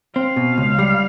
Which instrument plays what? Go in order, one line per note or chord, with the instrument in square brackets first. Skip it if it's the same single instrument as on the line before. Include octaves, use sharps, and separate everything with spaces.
[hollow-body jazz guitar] C4 [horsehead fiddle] F5
[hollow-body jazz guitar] B2
C#2
G3